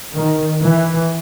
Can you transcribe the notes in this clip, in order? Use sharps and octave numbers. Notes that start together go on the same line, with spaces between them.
D#3
E3